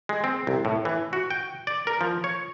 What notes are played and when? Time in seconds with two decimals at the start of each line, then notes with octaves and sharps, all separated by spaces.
0.09 G#3
0.24 C4
0.47 C2
0.65 A2
0.85 E3
1.13 F#4
1.30 G5
1.67 D5
1.87 A#4
2.01 F3
2.24 C#5